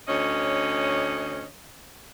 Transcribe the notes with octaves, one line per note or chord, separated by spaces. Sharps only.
D2 C#4 C#5 D#5